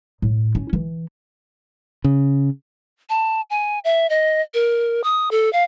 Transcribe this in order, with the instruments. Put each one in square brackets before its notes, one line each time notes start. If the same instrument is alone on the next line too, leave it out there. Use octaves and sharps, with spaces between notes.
[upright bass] A2
C#4
E3
[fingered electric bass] C#3
[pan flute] A5
G#5
E5
D#5
A#4
D#6
A4
F5